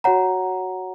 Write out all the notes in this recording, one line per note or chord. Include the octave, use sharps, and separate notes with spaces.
F#4 C#5 F#5 A#5